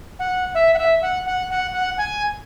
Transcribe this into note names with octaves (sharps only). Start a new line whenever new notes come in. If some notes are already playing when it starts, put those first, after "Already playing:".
F#5
E5
F#5
E5
F#5
F#5
F#5
F#5
G#5